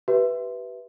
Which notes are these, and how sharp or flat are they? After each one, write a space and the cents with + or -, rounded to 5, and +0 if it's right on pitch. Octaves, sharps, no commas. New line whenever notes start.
G4 -30 B4 +0 E5 +0